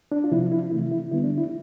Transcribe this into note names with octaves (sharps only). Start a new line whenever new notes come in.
D4
F4
C3 F3 C4 E4
E4
C3 E3 A3 E4
E4
D3 G3 B3 E4
D4
E4